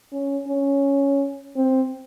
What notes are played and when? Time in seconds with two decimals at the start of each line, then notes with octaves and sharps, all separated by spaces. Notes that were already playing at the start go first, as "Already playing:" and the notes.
0.12 C#4
0.47 C#4
1.56 C4